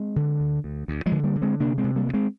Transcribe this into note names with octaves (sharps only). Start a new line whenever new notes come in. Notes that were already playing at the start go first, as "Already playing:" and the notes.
Already playing: G#3 C4
D3
D2
D2
D2
F3 G#3
D3
G3 A#3
D3
G#3 C4
C3 A#3 D4
G#3 C4
C3
G3 A#3
D2
G#3 C4